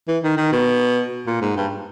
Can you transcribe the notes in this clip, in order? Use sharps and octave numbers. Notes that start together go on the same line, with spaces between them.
E3
D#3
D#3
B2
A#2
G#2
G2